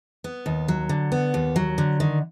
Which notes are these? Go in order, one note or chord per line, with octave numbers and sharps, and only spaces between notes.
B3
D#2
F#3
D3
B3
D#2
F#3
D3
D#3